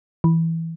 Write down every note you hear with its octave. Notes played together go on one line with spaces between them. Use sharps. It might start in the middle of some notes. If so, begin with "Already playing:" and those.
E3